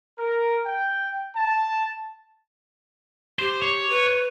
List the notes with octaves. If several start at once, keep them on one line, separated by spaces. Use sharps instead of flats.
A#4
G5
A5
G4 C5
C#5
B4